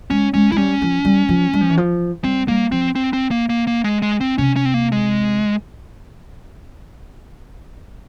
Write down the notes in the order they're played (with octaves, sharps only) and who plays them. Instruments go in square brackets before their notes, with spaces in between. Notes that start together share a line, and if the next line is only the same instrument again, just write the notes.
[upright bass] G#3 [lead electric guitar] C#4
[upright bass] G#3 [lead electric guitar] C#4
[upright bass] G#3 [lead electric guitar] E4
[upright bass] G3 [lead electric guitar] C#4
[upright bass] F3
G3
F3
G3
F3
E3
F3
[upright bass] G3 [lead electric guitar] C4
[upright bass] G3 [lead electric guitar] A#3
[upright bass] F3 [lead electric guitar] C4
[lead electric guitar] C4
C4
A#3
A#3
A#3
G#3
G#3
C4
[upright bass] C3 [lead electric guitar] C#4
[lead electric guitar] C#4
C4
A#3
G#3